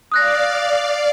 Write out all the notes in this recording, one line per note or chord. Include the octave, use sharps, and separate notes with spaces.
D5 F5 D#6 F#6 A#6